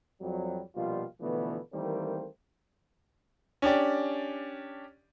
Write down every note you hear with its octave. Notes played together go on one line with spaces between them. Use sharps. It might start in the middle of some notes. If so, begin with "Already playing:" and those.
F2 F#3 G3
A#1 B2 F3 G3 F4
B2 D3 E3 F3 A3 B3
D#3 E3 G3 A3 A#3 C4
C#4 D4 G4 D5